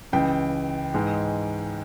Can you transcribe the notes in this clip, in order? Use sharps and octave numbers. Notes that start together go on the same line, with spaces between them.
C#2 C#3 E3 G5
G#2 E3 G#3